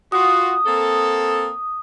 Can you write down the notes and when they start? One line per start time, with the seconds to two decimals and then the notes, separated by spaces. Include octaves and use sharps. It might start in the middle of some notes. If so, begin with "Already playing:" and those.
0.12 F4 F#4 D#6
0.66 A#3 C4 A4